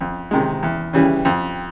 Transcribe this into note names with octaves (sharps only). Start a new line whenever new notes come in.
F2
C3 D#3 G#3
E2
C#3 E3 G3
F2